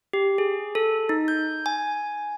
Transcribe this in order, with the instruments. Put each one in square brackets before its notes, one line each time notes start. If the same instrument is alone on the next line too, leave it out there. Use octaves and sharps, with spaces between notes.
[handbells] G4
G#4
A4
D#4
G6
G#5